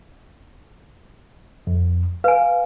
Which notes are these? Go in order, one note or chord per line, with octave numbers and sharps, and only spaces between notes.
F2
B4 F5 G#5